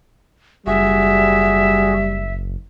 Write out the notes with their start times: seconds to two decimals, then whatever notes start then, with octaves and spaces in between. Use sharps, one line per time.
0.67 F#1 G3 F#4 G#4 E5